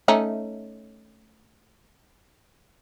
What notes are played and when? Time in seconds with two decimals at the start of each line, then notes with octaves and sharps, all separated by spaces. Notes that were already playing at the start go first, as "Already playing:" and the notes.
0.08 A3 C#4 D#4